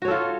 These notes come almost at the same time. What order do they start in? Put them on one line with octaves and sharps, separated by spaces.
F#4 C#5 A4 F4